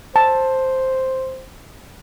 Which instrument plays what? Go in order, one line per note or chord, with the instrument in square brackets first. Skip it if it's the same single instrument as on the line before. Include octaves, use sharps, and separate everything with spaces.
[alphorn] C5 [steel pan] A5